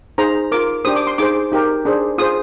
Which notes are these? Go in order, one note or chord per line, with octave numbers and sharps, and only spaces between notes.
D#4 G#4 C5 A#5
F4 A#4 D6
D4 G4 C5 D#6
D6
C6
D#4 G#4 C5 D6
D#4 G4 A#4
D4 G#4 C5
F4 G#4 C5 D#6